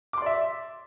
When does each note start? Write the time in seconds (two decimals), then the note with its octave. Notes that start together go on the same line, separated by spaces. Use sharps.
0.13 D6
0.18 C6
0.22 D5
0.26 E5